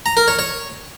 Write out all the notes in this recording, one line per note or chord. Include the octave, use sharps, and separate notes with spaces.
A#5
A#4
C#5
C#5